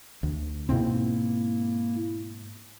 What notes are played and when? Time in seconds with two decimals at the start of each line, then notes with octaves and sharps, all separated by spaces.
0.23 D2
0.69 G#2 B2 A#3 C4 E4